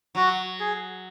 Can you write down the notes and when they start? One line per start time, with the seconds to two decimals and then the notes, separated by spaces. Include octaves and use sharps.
0.15 F#3 F#4
0.60 G#4